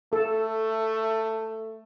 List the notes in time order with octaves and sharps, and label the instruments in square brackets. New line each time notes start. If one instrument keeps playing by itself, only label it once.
[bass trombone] A3 [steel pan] A4